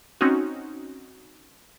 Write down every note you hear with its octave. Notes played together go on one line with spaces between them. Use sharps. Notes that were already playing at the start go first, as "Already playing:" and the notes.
C4 C#4 D#4 F#4